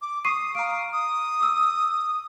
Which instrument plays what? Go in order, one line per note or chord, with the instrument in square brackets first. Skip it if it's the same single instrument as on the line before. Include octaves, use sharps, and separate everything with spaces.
[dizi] D6
[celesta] C#6 C7 D#7 [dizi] D#6
[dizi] F5 [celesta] A#5 D7
[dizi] D#6
[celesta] D6 E6